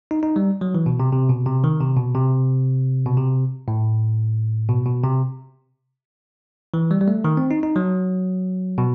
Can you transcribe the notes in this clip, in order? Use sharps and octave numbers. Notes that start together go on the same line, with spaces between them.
D#4
D#4
G3
F#3
E3
B2
C3
C3
B2
C3
D#3
C3
B2
C3
B2
C3
A2
B2
B2
C3
E3
G3
G3
A3
D#3
C4
D#4
D#4
F#3
B2